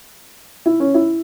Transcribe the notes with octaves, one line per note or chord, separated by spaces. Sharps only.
E4
C#4
E4